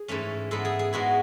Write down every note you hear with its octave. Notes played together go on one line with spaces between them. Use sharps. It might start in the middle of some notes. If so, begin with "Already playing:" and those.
Already playing: G#4
G#2 E3 A3 C#4
G#2 G#3 B3 E4 A4
G#4
G#4
G#2 G#3 B3 E4 F#4